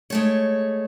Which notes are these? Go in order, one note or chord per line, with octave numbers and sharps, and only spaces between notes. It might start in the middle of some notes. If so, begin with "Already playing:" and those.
G#3 A3 C#5